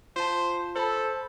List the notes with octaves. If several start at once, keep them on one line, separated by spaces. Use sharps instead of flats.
F4 C5 A5
A4 C5 B5